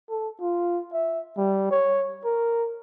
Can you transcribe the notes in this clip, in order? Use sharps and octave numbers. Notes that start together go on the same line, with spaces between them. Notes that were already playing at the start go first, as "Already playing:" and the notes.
A4
F4
E5
G3
C#5
A#4